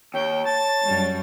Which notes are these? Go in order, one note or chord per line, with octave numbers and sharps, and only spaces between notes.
D#2 C#5 G5
A5 A6
F#2 G3